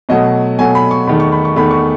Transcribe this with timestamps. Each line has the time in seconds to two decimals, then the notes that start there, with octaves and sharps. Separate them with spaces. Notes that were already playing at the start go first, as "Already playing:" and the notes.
0.09 B2 F#3 A3 D#5
0.59 B2 F#3 A3 G#5
0.75 B5
0.91 C#6
1.07 E2 D#3 A3 B5
1.20 C#6
1.32 B5
1.45 C#6
1.56 E2 D#3 A3 B5
1.71 C#6